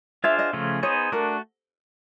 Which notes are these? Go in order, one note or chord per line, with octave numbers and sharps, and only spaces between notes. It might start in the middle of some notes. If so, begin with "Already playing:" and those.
D4 F4 G#4 C5 E5 F5
D#5
C#3 F3 A3 C#4 F4
B3 D#4 G#4 C5 C#5
A3 D4 F#4 A#4